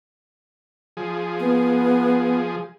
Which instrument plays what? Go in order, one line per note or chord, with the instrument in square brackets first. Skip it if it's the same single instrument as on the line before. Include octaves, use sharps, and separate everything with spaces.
[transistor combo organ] F3 G#4
[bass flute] B3